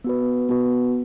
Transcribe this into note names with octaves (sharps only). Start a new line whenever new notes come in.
B3 F#4 B4
B3 F#4 B4